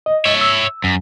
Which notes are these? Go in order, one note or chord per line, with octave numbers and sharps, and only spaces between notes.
D#5
C#5 E5
E6
F#2